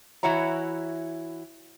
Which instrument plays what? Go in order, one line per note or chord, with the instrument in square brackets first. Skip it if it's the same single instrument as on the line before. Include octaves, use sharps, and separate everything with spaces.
[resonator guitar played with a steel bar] E3 E4 F#4 C#5 A#5